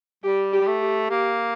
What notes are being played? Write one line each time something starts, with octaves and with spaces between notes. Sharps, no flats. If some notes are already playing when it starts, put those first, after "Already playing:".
G3 G4
G4
G3
A3
G4
A#3 G4